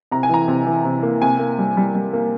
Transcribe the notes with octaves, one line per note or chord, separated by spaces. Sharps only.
C3 A#5
G#5
E3 A#5
C3
E3
C3
A#3
C3 G#5
A#3
G3
G3
G3
A#3